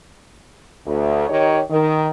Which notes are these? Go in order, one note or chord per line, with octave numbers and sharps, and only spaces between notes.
D2
D#3 D#4 G4 C#5
D#3